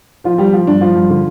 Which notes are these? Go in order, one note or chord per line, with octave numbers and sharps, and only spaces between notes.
F3 F4
F3 G3 G4
F3 F4
G2 D4
F3 F4
G2
D3